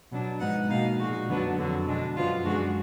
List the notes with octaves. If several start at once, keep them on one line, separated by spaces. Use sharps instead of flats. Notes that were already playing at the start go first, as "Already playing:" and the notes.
B2 F#3 D4
G#2 F3 B3 D#4 F#5
B2 A#3 D#4 F5
A#2 G#3 D#4 F#4
F2 D3 F#3 B3 D4
F2 D3 F#3 F#4
B2 G#3 D4
F#2 D3 F3 B3 F4
F#2 D3 G#3 D4 F#4